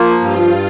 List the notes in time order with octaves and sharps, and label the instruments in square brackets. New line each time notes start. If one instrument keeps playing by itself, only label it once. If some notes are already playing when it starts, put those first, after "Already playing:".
Already playing: [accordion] F3 A#3
[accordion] G2 [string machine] F4